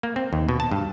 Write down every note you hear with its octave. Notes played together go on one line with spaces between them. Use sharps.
A#3
C4
D#2
B2
A5
G2